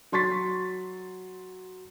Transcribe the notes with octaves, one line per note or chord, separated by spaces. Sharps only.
F#3 C6 C#6 A6 B6